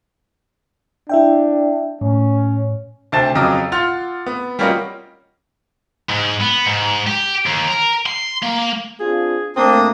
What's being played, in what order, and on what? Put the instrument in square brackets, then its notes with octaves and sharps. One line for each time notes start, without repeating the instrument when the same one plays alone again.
[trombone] D4 [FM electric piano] E4 E5 G5
[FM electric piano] A2 [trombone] C#4
[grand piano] D2 C3 C4 A5 A6 E7
F2 C#3 F#3 D#5 D6 E6
F4 F#5 C6 F6 A6 F7
B3
G3 A#3 C#4 F4 F#4 D#5
[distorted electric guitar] G#2
B3
G#2
G4
D#2
A#4
C6
A#3
[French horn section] C4 D4 F4 [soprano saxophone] G#4
[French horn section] A#2 A3 [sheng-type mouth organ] A#3 D4 D#6 [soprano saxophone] C4